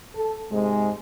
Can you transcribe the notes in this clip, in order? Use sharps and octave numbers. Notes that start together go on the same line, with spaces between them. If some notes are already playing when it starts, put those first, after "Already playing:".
A4
G#2 C3 G#3